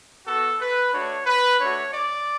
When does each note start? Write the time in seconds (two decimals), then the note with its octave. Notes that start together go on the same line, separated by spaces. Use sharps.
0.26 B3 F#4 A4
0.60 B4
0.92 A3 D4 F#4 C#5
1.26 B4
1.59 A3 D4 F#4 C#5
1.91 D5